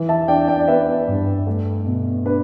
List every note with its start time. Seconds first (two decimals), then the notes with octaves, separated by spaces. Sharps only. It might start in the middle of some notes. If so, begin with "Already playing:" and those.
Already playing: E3
0.09 E5 A5
0.28 D4 D5 G5
0.48 D5 G5
0.59 D5
0.68 B3 B4 E5
1.08 G2
1.47 A3
1.86 B2
2.25 D4 B4